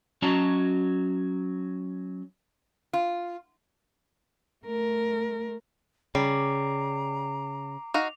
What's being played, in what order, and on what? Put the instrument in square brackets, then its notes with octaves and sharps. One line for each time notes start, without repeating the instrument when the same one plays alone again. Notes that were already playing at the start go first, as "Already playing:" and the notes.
[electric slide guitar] F#3 C#4 F#4 D#5 A5 A#5
[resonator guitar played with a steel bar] F4
[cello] A3 A#4
[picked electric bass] C#3 [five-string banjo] G3 [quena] A#5 [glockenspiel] D6 C7 D7
[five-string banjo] D#4 F#4 F5 [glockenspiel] F7